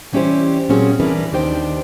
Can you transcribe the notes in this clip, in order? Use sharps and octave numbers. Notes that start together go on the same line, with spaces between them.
E3 G3 C#4 E4 G4 C5
A#2 F#3 C4 C#4 G#4
E3 G3 D4 A#4 B4
D#2 D#3 D4 G4 C5 G5